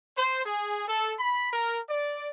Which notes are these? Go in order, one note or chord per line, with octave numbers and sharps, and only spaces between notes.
C5
G#4
A4
B5
A#4
D5